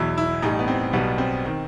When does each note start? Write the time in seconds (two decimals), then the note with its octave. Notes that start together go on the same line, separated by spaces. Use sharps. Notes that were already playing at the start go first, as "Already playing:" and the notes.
Already playing: E2 B2 F#3 E4
0.18 E4
0.42 A1 A2 G3 D#4
0.59 B3
0.68 C4
0.93 B1 B2 G3 B3
1.18 C4
1.46 D#3